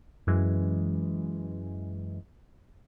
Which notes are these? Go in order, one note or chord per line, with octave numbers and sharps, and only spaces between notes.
F#2 E3 G#3